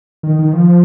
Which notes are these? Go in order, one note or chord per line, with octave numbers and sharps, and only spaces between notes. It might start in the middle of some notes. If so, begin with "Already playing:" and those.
D#3
D#3
F3